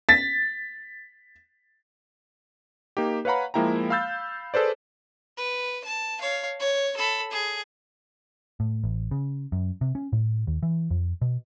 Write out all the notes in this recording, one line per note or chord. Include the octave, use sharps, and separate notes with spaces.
A6 B6
A#3 D#4 G4
B4 C#5 F5 F#5 A#5 B5
F3 G#3 A#3 E4 G5 A#5
F5 B5 E6 G6 A6
G#4 A4 B4 C5 D5
B4
A5
C#5 F5
C#5
A4 B5
G#4
A2
A1
C#3
F#2
C3
C#4
A2
D#2
E3
F2
B2